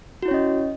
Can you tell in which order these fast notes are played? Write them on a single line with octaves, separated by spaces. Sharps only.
F#4 E4 C#5 C#4 D#5